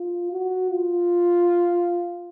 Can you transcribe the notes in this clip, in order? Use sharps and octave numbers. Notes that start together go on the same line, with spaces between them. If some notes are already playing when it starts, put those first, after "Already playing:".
Already playing: F4
F#4
F4